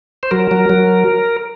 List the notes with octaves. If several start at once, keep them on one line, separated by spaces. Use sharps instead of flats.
C5
F#3 A#4
F#3
F#3